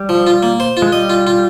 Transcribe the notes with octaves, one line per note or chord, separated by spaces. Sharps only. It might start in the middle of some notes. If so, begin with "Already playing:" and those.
Already playing: G3
F3
F4
A#3
C5
F4
G#3
G3 D#5
F4
F4